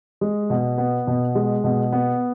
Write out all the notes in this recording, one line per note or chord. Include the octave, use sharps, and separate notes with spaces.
G#3
B2
B3
B2
G#3
B2
B3